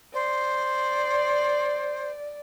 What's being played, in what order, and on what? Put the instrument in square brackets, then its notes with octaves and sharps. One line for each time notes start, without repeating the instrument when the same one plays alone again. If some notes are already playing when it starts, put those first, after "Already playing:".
[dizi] C5 [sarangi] D5